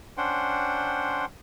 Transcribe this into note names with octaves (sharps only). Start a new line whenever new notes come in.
C#4 D4 C5 F#5 G5 C6